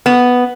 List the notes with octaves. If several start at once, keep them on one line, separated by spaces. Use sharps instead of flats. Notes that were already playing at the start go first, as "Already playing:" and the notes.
B3